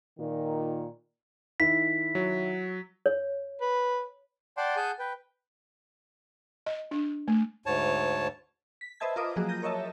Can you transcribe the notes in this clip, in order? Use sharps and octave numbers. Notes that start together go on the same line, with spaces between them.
A#2 D#3
D#3 E4 B6
F#3
C#5
B4
D5 F#5 G5 A5 C6 D6
G#4 F#5 G#5 A5 G6
B4 G5
D#5
D4
A3
D2 G#2 C#5 A5
B6
B4 C5 D#5 E5 A5 G#6
F4 A#4 B4 D#5 D6 D#6
F3 F#3 A#3 F#4 G#4
G6 A#6 D#7
A#4 C#5 D#5 E5 A5